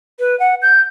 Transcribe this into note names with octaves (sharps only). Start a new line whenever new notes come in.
B4
F#5
G6